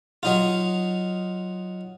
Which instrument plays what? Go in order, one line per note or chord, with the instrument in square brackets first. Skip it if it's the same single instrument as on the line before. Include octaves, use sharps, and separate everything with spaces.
[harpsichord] F#3 D#4 F4